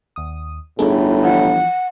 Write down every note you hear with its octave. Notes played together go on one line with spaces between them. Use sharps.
D#2 D#6
G1 A2 D#4 G#4 A4
E3 F3 F#5